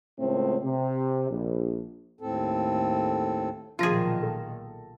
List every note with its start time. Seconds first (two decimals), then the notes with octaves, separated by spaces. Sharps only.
0.19 C#2 A2 A3 C4
0.64 C3
1.30 A#1
2.21 D#2 A2 C4 A4
3.79 B1 A#2 D#3 F3 F4 G#4 A5 A#6
4.22 A4